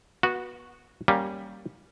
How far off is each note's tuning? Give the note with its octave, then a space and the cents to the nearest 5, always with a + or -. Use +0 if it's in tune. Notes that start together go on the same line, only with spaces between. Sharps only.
B3 -25 F#4 -10
G3 +0 A#3 +15 C#4 +0